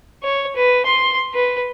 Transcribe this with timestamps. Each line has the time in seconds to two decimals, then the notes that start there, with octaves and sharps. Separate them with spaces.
0.23 C#5
0.56 B4
0.85 C6
1.34 B4